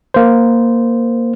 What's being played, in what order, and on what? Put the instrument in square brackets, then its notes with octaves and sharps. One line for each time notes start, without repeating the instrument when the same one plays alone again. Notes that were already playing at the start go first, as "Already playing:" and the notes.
[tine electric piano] A#3 C5